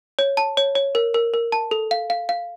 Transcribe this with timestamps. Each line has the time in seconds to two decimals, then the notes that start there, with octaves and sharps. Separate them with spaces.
0.19 C#5
0.37 A5
0.57 C#5
0.75 C#5
0.95 A#4
1.14 A#4
1.34 A#4
1.52 A5
1.71 A4
1.91 F5
2.10 F5
2.29 F5